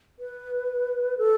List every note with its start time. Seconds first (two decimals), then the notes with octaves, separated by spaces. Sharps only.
0.19 B4
1.18 A4